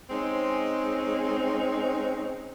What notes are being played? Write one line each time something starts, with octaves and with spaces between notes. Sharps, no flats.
G#3 C4 C#4 D#4